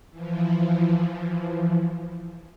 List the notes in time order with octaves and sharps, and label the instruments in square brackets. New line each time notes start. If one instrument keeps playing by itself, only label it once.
[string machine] E3 F3